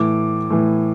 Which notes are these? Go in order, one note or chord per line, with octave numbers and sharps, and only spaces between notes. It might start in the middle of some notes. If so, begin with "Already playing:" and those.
Already playing: A2 E3 D6
A2 E3